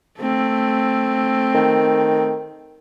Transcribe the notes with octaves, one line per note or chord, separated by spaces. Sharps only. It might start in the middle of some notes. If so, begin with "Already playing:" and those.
A3 C4
D#3